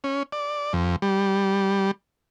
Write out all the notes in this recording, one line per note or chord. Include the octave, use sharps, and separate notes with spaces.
C#4
D5
F2
G3